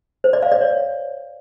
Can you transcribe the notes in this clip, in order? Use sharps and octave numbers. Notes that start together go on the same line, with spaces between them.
C5
D5
F5
D5
C#5